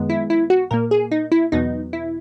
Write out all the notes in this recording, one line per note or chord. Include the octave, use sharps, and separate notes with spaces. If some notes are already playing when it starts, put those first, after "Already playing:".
Already playing: F#2 D#3 G#3 B3
E4
E4
F#4
A#2 A#3 A#4
G#4
D#4
E4
E2 B2 F#3 B3 D#4
E4